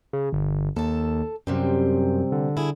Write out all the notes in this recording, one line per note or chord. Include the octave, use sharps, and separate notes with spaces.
C#3
G1
D#2 A4 A5
F#2 C3 G3 C4
D3
E4 G#4